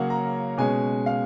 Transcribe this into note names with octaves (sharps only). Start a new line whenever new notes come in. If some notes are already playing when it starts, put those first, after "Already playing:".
Already playing: C#3 F#3 A#3 C#4 F5 F#5
A#5
B2 G#3 C#4 G#5
F5